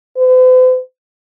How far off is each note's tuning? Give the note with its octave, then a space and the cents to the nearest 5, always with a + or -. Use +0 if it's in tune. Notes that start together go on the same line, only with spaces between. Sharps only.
C5 -45